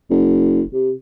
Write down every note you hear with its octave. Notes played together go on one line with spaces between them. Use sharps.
F#1
C3